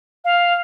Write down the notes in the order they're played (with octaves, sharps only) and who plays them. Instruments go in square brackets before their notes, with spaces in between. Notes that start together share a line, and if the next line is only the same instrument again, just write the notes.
[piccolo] F5